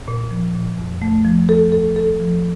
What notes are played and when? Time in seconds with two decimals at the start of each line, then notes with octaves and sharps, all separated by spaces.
0.08 A#2
0.31 F3
0.55 A#2
0.78 F2
1.02 A3
1.25 F3
1.49 A4
1.72 A4
1.96 A4
2.20 F3